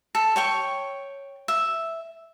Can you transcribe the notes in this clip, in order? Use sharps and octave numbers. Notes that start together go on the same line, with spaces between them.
A4
C#5 G5 C#6
E5